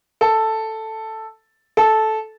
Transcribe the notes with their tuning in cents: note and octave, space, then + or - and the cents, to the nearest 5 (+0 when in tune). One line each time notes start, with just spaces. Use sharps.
A4 +5
A4 -10